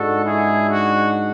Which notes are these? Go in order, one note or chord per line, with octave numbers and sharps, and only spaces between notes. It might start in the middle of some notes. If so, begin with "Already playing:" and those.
Already playing: G#2 G#3 D4 F#4 A4
E4 G#4
F#4